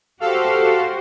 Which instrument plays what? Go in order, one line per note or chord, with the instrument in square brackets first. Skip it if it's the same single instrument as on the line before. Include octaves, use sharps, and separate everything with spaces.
[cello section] F#4 G4 C5 [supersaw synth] A4 F5